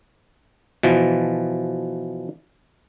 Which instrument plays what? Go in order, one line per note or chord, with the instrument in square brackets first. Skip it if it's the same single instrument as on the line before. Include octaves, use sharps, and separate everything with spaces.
[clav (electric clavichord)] B2 E3 F3